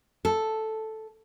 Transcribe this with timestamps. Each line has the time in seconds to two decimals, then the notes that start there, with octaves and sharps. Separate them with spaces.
0.25 A4